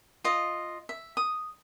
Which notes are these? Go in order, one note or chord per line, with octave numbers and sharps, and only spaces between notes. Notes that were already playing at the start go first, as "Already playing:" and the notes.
F4 D#5
E5
D#6